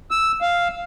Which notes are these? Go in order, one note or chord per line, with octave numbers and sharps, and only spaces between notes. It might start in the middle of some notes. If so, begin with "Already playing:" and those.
E6
F5